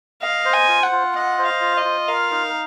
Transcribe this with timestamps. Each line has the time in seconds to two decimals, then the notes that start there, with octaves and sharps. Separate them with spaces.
0.22 D#5 F5
0.45 C5
0.53 G#5
0.68 F4
0.83 F#5
0.92 F4
1.15 D#5 F#5
1.39 C5
1.46 F5
1.61 F4
1.77 D#5
1.85 F4
2.08 A#4 F5
2.31 D#4